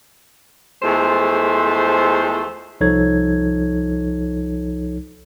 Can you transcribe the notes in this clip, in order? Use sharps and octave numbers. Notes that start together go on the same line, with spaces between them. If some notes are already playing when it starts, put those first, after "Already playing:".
E2 F3 G#3 A3 A4 C5
C2 F3 D#4 A4 C#5 G#6